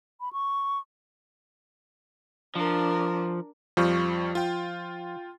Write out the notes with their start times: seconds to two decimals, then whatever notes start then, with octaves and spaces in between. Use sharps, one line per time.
0.21 B5
0.33 C#6
2.56 F3 D4 A#4
3.77 F2 F3 G3 C#6
4.35 F4 G5